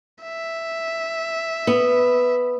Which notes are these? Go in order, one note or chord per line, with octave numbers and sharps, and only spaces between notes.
E5
B3